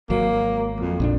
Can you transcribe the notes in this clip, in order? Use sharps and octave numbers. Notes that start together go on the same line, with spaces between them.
G#1 F#3 A#3
F2
A#1 D3 D4